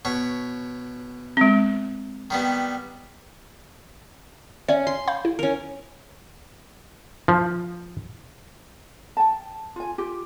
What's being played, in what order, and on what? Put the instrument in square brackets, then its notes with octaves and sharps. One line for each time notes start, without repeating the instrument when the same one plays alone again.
[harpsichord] B2 C#5
[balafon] G#3 C4
[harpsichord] D#3 G3 B3
[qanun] C#4 [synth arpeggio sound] C#5 D5 E5
[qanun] C6
[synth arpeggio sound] F5 B5 G6
E4
[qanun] C#4 A#4
[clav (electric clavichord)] F3
[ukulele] G5 A5
F4 G#5
F4 G4